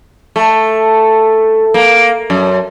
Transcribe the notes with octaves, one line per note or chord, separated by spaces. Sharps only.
A3
A#3
F#2